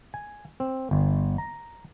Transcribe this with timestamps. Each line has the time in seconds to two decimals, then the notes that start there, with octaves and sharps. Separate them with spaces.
0.14 G#5
0.60 C4
0.91 G1
1.38 A#5